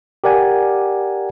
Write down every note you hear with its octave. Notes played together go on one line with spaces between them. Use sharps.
G4 A#4 D5 F#5 G#5